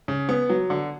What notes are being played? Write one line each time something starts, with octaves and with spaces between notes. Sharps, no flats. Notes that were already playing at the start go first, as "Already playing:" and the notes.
C#3
B3
F#3
D3